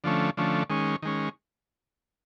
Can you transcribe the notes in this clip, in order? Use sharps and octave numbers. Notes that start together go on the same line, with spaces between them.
D3 F3 A3 C#4
D3 F3 A3 C#4
D#3 G#3 C#4
D#3 G#3 C#4